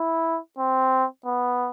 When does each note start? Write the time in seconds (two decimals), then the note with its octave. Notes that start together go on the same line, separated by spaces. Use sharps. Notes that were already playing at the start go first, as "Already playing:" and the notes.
Already playing: E4
0.59 C4
1.26 B3